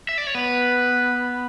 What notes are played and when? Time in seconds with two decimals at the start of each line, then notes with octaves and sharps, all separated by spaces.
0.09 E5
0.18 D5
0.27 C#5
0.35 B3 B4